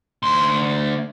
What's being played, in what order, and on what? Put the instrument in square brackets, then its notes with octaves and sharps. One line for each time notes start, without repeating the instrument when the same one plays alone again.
[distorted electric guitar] D2 C6